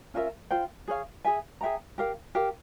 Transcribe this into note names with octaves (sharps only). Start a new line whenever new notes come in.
C#4 F4 A#4 E5
F4 C5 G5
G#4 C#5 F5
G#4 E5 G#5
G#4 E5 G5 A#5
G4 A#4 F5
G4 A#4 F5